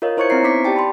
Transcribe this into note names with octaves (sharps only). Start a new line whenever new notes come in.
F4 A#4 C#5 D#5 F5
E4 C5 C#5 C#6 G#6 C#7
C4 E4 C5 A#5 C7
B3 D#4 C#6 D6 B6 C#7
G4 D5 G5 A5
B5 C6